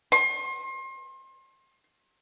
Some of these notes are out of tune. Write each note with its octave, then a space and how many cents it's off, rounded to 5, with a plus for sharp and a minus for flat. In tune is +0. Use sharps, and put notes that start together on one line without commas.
C6 +35